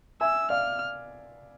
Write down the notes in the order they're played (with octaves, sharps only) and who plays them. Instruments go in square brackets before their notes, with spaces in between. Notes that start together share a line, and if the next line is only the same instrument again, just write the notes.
[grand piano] E5 G#5 [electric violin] E6
[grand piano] D5 F5 [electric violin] F6